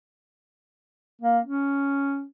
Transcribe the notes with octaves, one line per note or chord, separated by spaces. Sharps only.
A#3
C#4